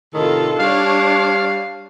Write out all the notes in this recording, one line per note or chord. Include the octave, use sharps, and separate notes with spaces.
A2 C3 D#3 F4 A4
G3 D4 C#5 F5